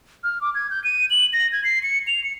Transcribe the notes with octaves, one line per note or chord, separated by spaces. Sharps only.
F6
D6
G#6
G6
D#7
F#7
A#6
G#6
C7
C#7
F7
C#7